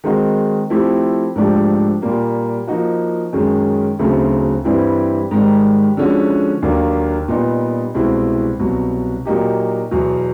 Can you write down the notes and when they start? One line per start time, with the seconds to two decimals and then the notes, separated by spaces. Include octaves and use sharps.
0.04 D#3 G#3 C4 D#4 F#4
0.70 F3 A3 C4 E4 G4
1.35 G#2 F3 A3 D4 G4
2.02 A#2 G3 A#3
2.67 F3 A#3 D#4 F#4
3.33 F#2 D#3 G#3 C#4
3.99 D2 C#3 F#3 A3 C4
4.64 G2 E3 G3 C4 E4
5.31 G#2 D#3 G3
5.97 D3 F3 G#3 C#4 F#4
6.62 D#2 D3 F#3 A#3 D4
7.28 A#2 G3 B3 D#4
7.94 C2 B2 G#3 C4 E4
8.60 C2 B2 F#3
9.25 A#2 F#3 A#3 D#4 G4
9.91 E2 B2 F#3